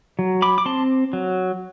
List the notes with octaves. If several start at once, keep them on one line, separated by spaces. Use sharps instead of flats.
F#3
B5 D6
D6
C4 A5 C6
F#3